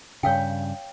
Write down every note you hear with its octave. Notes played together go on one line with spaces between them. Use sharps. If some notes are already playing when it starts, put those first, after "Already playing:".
G2 C#3 C#5 F5 G5